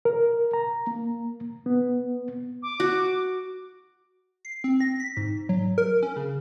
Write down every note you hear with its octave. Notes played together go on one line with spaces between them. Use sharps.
A#4
A#5
A#3
B3
D6
F#4
C7
C4
A#6
B6
G#2
F#3
A#4
C#4
C#3